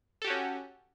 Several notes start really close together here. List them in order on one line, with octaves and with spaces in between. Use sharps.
A4 G4 F#4 C#4